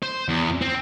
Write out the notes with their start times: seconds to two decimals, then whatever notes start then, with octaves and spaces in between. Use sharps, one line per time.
0.03 C5
0.29 E2
0.61 C4